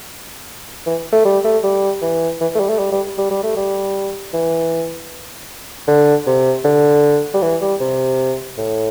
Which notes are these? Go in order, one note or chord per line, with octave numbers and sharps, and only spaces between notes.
E3
A3
G3
A3
G3
E3
E3
A3
G3
A3
G3
G3
G3
G3
A3
G3
E3
D3
C3
D3
G3
E3
G3
C3
A2